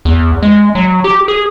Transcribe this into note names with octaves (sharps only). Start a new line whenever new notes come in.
E2
G#3
F#3
G4
G#4